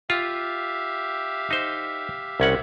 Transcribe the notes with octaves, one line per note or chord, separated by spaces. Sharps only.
F4 G4 E5 F5
D#4 C5
C2 C#4 F#5